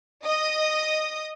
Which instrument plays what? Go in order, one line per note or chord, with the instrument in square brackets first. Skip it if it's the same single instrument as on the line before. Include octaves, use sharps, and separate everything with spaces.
[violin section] D#5 D#6